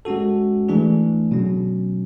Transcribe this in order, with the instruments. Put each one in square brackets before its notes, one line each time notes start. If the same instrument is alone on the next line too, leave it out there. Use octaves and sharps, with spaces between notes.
[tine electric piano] G#3 C#4 F#4 A4
E3 A3 D4 G#4
B2 F#3 C#4